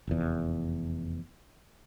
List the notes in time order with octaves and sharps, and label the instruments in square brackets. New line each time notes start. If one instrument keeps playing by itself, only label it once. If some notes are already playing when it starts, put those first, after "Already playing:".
[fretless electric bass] F1 E2